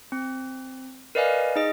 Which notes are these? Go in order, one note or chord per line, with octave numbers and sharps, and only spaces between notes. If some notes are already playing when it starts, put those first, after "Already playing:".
C4
A#4 B4 D5 D#5 F5 G#5
D#4 G#4 D#5